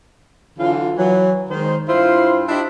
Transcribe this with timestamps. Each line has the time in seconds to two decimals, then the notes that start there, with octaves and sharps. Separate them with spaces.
0.59 D3 E3 F#3 F4
0.97 E3 F#3
1.50 D#3 G#3 C5
1.89 G2 E4 F4 C5
2.49 D4 E4 F4 G4 D#5 E5